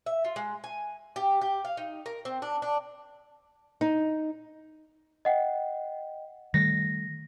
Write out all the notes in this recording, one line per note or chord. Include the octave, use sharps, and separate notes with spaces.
E5
F4
G#3
G#5
G4
G4
F5
D#4
A#4
C4
D4
D4
D#4
D#5 F#5 G5
D#3 G3 A3 A#6